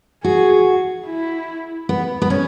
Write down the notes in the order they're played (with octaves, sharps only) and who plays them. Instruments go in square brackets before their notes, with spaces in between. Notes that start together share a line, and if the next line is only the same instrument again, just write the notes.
[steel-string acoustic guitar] F#4 [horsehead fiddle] G#4
[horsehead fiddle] E4
[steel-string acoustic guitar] B3
B3
C#4